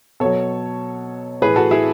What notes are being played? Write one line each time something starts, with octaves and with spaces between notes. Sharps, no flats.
B2 F#3 A4 C#5
A2 E3 G#4 B4
F#4 A4
E4 G#4